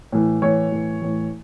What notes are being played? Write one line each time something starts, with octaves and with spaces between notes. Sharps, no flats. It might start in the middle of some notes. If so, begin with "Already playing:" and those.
A2 E3
A2 E3 C#5
A2 E3
A2 E3